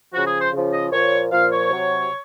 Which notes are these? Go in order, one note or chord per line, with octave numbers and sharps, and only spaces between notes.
C#3 F3 F#4
G#4
C5
C#3 F3
D#5
A#2 F3 C#5
A#2 F3 F5
C#5
C3 F#3